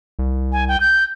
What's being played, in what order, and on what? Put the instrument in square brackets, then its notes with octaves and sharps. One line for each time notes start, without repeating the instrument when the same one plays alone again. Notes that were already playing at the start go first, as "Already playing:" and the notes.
[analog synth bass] C2
[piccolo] G#5
G5
G6